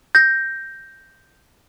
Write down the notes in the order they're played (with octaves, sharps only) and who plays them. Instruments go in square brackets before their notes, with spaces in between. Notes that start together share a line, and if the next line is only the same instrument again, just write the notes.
[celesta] G6 A#6